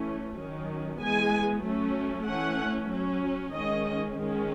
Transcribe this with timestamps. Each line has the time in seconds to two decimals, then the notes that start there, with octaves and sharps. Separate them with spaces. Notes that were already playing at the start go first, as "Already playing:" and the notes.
Already playing: E3 A3 C#4
0.36 D#3 F#3 C#4
0.99 E3 G#3 B3 G#5
1.63 F#3 A3 C#4
2.26 E3 A3 C#4 F#5
2.90 F#3 C#4
3.54 D#3 G#3 C#4 D#5
4.17 D#3 G#3 C#4